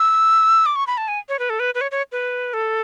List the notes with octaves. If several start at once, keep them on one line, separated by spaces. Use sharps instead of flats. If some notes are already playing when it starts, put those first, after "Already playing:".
Already playing: E6
D6
C#6
B5
A5
G#5
C#5
B4
A4
B4
B4
C#5
C#5
B4
A4